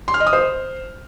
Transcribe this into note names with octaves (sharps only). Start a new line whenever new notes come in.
C6
F6
D#5
D#6
C5